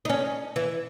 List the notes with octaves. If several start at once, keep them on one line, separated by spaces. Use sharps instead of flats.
D#4
C#4
E3